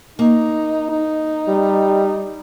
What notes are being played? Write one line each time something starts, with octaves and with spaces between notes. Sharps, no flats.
A#3 D#4
D#4
G3